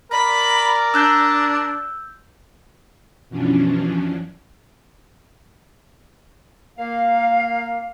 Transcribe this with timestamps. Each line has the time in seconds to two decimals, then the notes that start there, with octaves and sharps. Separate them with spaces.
0.12 A#4 D5 B5
0.94 D4 E6 F#6 G6
3.29 F#2 B2 E3 F3 C#4 D4
6.78 A#3 F5